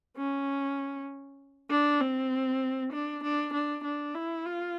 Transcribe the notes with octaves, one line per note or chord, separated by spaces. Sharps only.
C#4
D4
C4
D4
D4
D4
D4
E4
F4